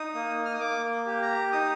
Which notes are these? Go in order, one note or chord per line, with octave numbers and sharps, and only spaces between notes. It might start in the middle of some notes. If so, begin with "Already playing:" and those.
Already playing: D#4 D#6
A#3
F6
D#6
A#3 D6
G4
A#5
D#4 D#6